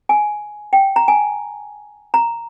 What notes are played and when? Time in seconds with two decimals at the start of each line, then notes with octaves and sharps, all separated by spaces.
0.09 G#5
0.73 G5
0.96 A#5
1.08 G#5
2.14 A#5